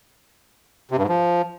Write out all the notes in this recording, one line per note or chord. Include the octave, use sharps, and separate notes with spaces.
C3
G2
G#2
F3